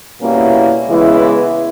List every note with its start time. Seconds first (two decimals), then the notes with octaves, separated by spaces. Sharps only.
0.20 B2 G3 A#3 C#4 E4
0.87 C#3 E3 G#3 B3 E4